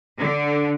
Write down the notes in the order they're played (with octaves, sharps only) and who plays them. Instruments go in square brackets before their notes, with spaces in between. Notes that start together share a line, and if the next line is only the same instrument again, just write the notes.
[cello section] D3